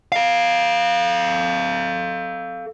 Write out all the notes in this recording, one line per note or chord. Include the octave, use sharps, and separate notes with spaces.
A4 F5